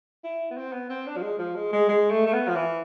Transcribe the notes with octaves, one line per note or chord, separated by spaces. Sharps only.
E4
B3
C4
B3
C4
D4
F3
G#3
F3
G#3
G#3
G#3
A3
A3
B3
F3
E3